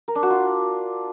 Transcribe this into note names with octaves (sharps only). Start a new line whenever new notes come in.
A#4
D4
F#4
F4